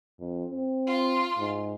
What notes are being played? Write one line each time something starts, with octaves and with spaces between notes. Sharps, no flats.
F2
C4
F4 C6
G#2